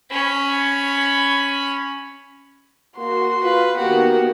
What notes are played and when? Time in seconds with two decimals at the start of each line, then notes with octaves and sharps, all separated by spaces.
0.11 C#4 B5
2.98 A#3 F#4 C6
3.43 F4 B4
3.77 D#3 A#3 B3 F#4 G4